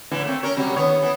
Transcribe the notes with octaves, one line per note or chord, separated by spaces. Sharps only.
A2 D3 E3
A3 A#3 C4
C#4 A#4 C#5
C3 F#3 G3
D#2 B3 C#5
E3 B3